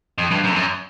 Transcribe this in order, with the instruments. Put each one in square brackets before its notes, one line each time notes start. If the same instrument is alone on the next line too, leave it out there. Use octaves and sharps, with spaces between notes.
[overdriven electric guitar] F2
G2
F#2
F2
F#2